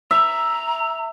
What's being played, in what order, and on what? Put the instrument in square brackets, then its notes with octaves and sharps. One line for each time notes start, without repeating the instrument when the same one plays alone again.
[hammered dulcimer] E5 [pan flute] A#5